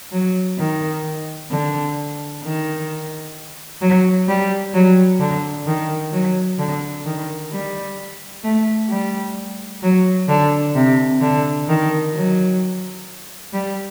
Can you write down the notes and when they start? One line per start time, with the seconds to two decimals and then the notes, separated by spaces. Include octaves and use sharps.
0.12 F#3
0.58 D#3
1.51 D3
2.43 D#3
3.81 F#3
4.28 G3
4.74 F#3
5.20 D3
5.67 D#3
6.13 F#3
6.59 D3
7.05 D#3
7.52 G3
8.44 A3
8.90 G3
9.83 F#3
10.28 D3
10.75 C3
11.21 D3
11.68 D#3
12.15 F#3
13.53 G3